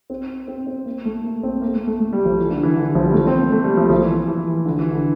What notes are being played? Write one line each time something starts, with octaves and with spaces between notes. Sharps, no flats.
C4
C4
C4
A#3
A3
A#3
C4
A#3
A3
A3
A3
G3
F3
E3
D3
E3
D3
E3
F3
G3
A3
C4
A#3
A3
G3
F3
F3
E3
E3
E3
E3
D3
E3
D3